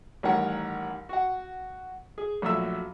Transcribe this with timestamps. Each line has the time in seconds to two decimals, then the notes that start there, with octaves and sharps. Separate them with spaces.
0.23 A1 D#3 G3 A#4 C#5 F#5
1.09 F#4 F#5
2.18 G#4
2.42 A#1 F#3 A3 E5 E6